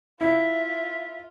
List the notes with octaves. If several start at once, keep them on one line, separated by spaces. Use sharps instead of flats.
E4 F4 E5